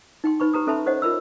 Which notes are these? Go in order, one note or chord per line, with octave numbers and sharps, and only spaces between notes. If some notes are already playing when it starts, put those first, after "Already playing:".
D#4 G5 C6
D#4 B4 B5 C#6
G4 B4 A#5 D#6
C#4 A4 E5 A5 B5 C6
G4 C5 C#5 D#5 F#5
F4 A#4 B5 E6